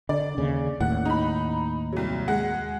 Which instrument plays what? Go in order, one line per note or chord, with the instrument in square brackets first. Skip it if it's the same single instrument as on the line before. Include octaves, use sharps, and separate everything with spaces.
[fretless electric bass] D3 [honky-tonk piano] D5
[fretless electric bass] D#2 C#3
[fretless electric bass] D#2 A2 [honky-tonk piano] F#5
[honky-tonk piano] D#4 B5
C2 F#3
G#3 F#5